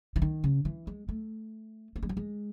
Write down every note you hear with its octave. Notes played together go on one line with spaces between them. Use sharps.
E3
D#3
C#3
E3
G#3
A3
A3
G#3
F#3
G#3